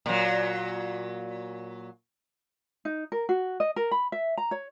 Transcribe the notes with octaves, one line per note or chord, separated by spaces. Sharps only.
A#2 F#3
D#4
A#4
F#4
D#5
A#4
B5
E5
A#5
C#5